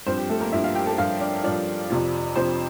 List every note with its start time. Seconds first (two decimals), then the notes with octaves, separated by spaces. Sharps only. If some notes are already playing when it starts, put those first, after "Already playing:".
0.06 G2 F3 C4 C5
0.18 G4
0.29 A3 A4
0.41 A#3 A#4
0.52 G2 F3 E4 E5
0.64 F4 F5
0.75 G4 G5
0.86 A4 A5
0.98 G2 F3 F4 F5
1.21 D4 D5
1.44 G2 F3 D4 D5
1.90 F2 C3 F3
2.36 F2 C3 F3 C4 C5